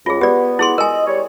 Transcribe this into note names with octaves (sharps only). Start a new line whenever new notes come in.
C#2 F4 G#4
B3 G4 D5
E4 G#4 C6
A#4 D#5 G#5
G3 C#5